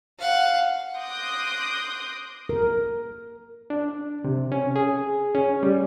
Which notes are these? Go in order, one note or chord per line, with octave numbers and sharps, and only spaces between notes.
F5 F#5
C6 D6 D#6 F#6 G6 A#6
A#4
D4
C3
C#4
G#4
C#4
G3